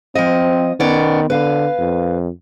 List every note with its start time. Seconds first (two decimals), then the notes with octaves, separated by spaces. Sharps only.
0.15 F3 C4 D#5
0.80 D#3 B3 C#4 D5
1.30 D3 B4 F5
1.79 F2